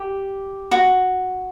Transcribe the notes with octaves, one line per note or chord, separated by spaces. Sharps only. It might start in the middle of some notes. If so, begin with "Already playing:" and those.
Already playing: G4
F#4